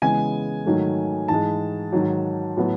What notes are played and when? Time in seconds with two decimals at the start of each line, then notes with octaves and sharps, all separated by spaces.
0.02 C#3 E3 G#3 B3 G#5
0.64 G#2 D#3 F#3 A3
1.28 G#2 E3 G#3 A5
1.92 G#2 D#3 F#3
2.57 A2 F#3 B3